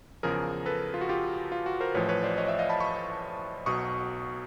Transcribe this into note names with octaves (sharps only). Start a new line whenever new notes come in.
E2 C#3 F3 G#4 A#4
A4 B4
F4
F#4
F4 G4
F4
F#4
A#4 C5
A1 A2 F3 B4 C#5
B4 C#5
C5 D5
C#5 D#5
D5 E5
D#5 F5
A5 B5
B5 C#6
B1 B2 F#3 C#6 D#6